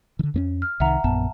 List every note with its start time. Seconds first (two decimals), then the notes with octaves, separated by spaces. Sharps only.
0.19 D3 D#3
0.34 F2 A#3 C#4
0.62 F6
0.80 C2 D#3 E5 F#5 A#5
1.04 A#1 F#2 B3 A5